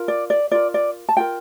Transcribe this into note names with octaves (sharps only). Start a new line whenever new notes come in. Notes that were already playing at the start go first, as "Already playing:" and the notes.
Already playing: F4 A#4
D5
D5
F4 A#4 D5
D5
A5
F4 A#4 G5